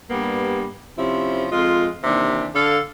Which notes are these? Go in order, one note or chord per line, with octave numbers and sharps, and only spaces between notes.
G2 G3 A#3 B3
C3 F3 C#4 E4
F2 G#3 F4
D#2 C3 E3 D4
D3 A4 F5